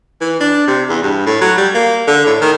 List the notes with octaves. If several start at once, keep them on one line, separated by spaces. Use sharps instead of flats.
E3
D4
C3
E2
G2
A2
F#3
G3
A#3
D3
A2
D#3